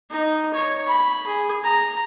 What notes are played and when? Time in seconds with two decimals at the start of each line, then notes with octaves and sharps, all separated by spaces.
0.11 D#4
0.54 C#5
0.88 B5
1.26 G#4
1.64 A#5